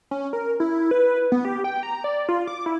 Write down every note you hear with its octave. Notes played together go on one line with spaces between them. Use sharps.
C#4
A#4
E4
B4
B3
G4
G5
A#5
D5
F4
D6
E4